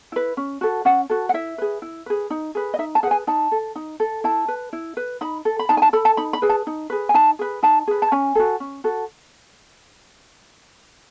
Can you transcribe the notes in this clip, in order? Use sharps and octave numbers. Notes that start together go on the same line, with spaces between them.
E4 B4
C#4
F#4 A4
C#4 F#5
F#4 A4
F#5
E4 E5
G#4 B4
E4
G#4 B4
D#4
G#4 B4
D#5
D#4 E5
A5
G#4 B4 F#5 G#5
D#4 A5
A4
D#4
A4
E4 A5
B4
E4
B4
D#4 B5
A4
B5
D#4 A5
G#5
A5
A4 B5
A5
D#4 B5
B5
G#4 B4
A5
D#4
G#4 B4
G#5
D#4 A5
G#4 B4
D#4 A5
G#4 B4
A5
C#4 G#5
F#4 A4
C#4
F#4 A4